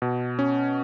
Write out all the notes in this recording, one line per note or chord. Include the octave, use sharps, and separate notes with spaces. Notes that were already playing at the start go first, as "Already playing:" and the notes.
B2
C#4